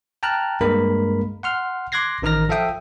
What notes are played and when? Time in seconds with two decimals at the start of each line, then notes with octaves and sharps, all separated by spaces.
0.23 G5 A5 A#5 F6 F#6
0.61 G2 G#3 A#3 A#4 B5
1.43 F#5 C6 F6
1.92 C6 D6 F#6 G#6 A#6 C7
2.22 A1 D#3 D#4 A#4 F6 A#6
2.49 F3 A4 E5 F5 G5 D#6